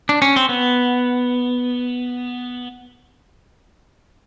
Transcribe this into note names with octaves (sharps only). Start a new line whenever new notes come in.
D4
C#4
C4
B3